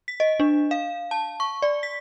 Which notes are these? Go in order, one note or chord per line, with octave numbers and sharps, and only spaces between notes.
B6
D#5
D4
F5
A5
C#6
D5
B6